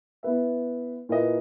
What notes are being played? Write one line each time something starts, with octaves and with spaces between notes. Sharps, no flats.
B3 E4 B4 E5
A#2 A#3 E4 B4 D#5